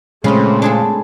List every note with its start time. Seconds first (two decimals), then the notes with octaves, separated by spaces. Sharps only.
0.24 A#2 C#3 G#3 A3 C4 F4 B5
0.62 D4 G#4 A4